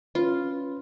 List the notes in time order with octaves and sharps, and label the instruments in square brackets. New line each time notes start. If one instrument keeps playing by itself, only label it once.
[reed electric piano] C#4 B4 [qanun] F4